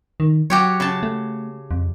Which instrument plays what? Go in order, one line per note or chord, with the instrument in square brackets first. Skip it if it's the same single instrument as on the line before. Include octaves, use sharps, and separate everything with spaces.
[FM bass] D#3
[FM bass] F#3 [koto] F#4 G4 C#5
[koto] C#3 A5
[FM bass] A3
F2